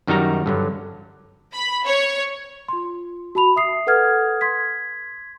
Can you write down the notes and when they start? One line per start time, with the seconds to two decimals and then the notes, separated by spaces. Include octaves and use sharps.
0.07 F#2 D#3 G3 D#4 F#4 A#5
0.46 G2 D3 F#3
1.54 B5
1.84 C#5
2.68 F4 C6
3.35 F#4 A5 B5 F7
3.56 E5 D#6 C7
3.87 A4 B4 F#5 D#6 F6 G#6
4.41 C6 G#6 B6